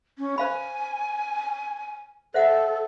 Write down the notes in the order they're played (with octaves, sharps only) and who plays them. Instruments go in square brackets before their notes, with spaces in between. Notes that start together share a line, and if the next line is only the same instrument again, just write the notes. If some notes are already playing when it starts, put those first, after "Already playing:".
[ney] C#4
[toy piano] C5 F5 B5 [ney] G#5
[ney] A4 [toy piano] C5 E5 F#5